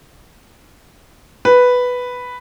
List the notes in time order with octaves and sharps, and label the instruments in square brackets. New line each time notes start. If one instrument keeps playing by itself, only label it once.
[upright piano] B4